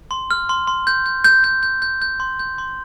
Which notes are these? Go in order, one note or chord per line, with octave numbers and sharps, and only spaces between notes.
C6
F6
C6
C6
G6
G6
G6
G6
G6
G6
G6
C6
G6
C6